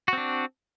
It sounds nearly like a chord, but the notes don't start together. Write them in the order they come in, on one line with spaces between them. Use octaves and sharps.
F#4 C4 D4